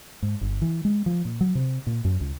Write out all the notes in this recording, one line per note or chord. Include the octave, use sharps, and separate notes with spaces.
G#2
G1
E3
G#3
F3
A#2
F#3
C3
A#2
F#2
C#2